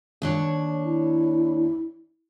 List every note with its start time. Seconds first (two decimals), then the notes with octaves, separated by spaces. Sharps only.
0.22 D#2 D4 C#5
0.84 E4